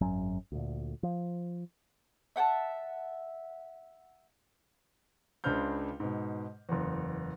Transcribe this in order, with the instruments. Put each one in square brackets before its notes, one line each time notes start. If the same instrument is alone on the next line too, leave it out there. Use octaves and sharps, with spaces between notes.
[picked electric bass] G#1 F#2 F#3 C#4
D2 A#2
F3
[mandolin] E5 F#5 G5 A5
[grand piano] C#2 C#3 D4 C5 F6 G6
G#2 B2
F#1 E2